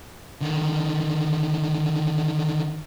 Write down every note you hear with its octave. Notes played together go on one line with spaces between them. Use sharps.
D3 D#3